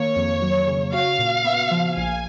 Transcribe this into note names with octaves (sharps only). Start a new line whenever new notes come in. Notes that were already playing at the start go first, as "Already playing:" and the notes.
Already playing: D#3 A#3 C#5
F2
F#3
C#3
F#4 F5
A#2
B3
F3
A#1 G#5